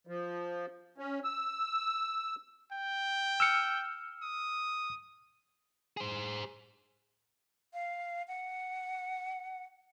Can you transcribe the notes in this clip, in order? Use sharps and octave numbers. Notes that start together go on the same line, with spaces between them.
F3
C#4
E6
G5
E6 F6 C#7
D#6
G#4 C5
F5
F#5